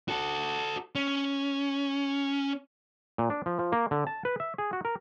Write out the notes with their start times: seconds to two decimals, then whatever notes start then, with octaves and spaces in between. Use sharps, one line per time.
0.08 F#4 A4
0.95 C#4
3.18 A#2
3.30 D4
3.46 F3
3.59 F3
3.72 A#3
3.91 D3
4.07 A5
4.25 B4
4.40 E5
4.58 G#4
4.73 F#4
4.85 A#4